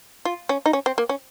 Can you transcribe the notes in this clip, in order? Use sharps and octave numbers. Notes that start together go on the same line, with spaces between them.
F4
C#4
D#4
C#4
C4
A#3
C#4